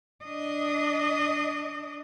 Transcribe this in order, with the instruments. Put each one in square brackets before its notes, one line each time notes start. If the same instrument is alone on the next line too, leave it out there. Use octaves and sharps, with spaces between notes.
[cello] D4 D#5